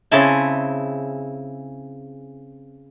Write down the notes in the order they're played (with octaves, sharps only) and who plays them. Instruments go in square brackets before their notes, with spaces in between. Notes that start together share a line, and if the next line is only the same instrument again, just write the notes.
[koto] C#3 C4 E4 G#4 G#5 A5